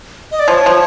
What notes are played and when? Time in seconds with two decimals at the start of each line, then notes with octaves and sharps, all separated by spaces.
0.31 D#5
0.39 D5
0.47 F3 C#5
0.66 F3